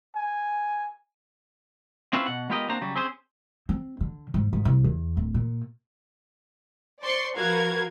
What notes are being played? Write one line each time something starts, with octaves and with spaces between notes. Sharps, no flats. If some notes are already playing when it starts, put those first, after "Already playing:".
G#5
C4 C#4 E4 F4 B4 C5
B2 F#5
G#3 B3 F4 G4 A#4 D#5
A#3 C4 D4 F#4 C5 A#5
C#3 F#3 G3
C4 C#4 G#4 C5
C4
D3
G#2
G#2
C2
E2
D1
A#2
C5 D5 C6 C#6
F3 F#4 A#4 B4 F5 G#6